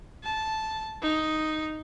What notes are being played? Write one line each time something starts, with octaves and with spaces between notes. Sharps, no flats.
A5
D#4